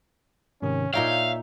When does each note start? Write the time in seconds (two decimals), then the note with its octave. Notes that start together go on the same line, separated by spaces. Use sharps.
0.62 G#2 C3 D#3 C#4
0.93 A#2 D#4 C#5 D5 E5 F5 G5